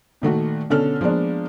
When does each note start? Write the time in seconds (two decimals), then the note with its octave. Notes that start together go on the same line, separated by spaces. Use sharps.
0.22 A#2 D#3 A3 F#4
0.70 B2 D3 C#4 A4 F6
1.01 F3 G#3 A#3 B3 D4